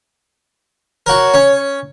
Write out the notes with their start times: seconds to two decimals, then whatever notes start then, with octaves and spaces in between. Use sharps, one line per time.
1.06 F#4 A#4 C#5
1.34 C#4